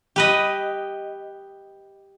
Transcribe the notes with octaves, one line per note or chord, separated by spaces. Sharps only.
G4 B4 D#5